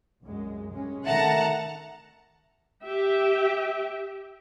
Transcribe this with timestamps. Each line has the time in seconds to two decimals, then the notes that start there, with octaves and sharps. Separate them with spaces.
0.22 C2 F#2 G#3
0.70 C2 G#3 C#4
1.05 C3 D#3 A3 E5 F#5 A5 A#5
2.85 G4 E5 G5